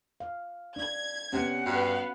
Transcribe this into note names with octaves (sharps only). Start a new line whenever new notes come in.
F5
D4 G#6
C3 B3 C#4 F#5
G2 B3 F#4 F5